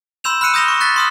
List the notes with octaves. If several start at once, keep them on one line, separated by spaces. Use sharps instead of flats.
B5 C6 E6 G6 E7 F7
B5 F6 F#6 C#7 D#7
D#6 G6 A#6 F7 G7
C#6
F#6 A6 B6
C6 D#6 F6